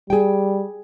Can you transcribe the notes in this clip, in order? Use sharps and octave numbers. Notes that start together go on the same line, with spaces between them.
G3 G#4 G5